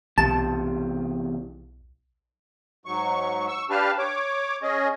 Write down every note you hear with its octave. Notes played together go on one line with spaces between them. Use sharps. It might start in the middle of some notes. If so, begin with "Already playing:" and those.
B1 E2 C3 A5
G#2 F#3 C#6
C#6 E6
D4 G4 B4 F5 A5 F6
C#5 D6
C#4 G#4 D#5